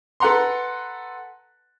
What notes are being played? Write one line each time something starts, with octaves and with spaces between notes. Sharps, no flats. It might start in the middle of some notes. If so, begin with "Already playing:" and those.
A4 B4 F#5 A#5 C6